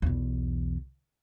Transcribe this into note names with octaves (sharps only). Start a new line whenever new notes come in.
B1 E2